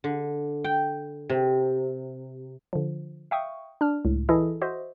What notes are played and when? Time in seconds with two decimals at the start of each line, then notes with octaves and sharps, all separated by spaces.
0.04 D3
0.64 G5
1.30 C3
2.73 D3 F3
3.31 E5 F5 G5 C#6 D#6
3.81 D4 F6
4.05 C#2 A2
4.29 E3 E4 G#4 A4 D#5
4.62 F#4 C5 D#5 E5